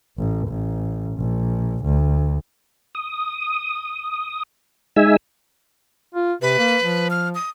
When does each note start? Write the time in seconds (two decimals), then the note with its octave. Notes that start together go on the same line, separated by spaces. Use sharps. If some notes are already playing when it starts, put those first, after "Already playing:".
0.18 A1
0.48 A1
1.17 A#1
1.85 D2
2.95 D#6
4.96 G#3 D#4 E5 G#5 E6
6.15 F4
6.42 C3 B4
6.58 A#3
6.82 F3
7.10 F6
7.35 D#6